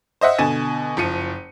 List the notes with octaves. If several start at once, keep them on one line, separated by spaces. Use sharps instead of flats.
C5 D#5 E5 F#5
B2 D3 G#5 A6 E7
F#1 F3 C#7 D#7